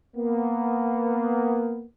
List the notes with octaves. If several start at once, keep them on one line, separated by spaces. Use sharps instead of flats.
A#3 B3